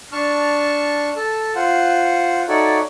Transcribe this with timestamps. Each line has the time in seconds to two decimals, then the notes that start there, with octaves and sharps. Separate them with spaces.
0.12 D4 A5 C#6 F6
1.16 A4 A5
1.55 F4 C5 F#5
2.48 D#4 F#4 A4 C#5 D5 E5